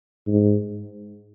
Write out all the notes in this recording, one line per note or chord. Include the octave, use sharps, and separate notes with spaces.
G#2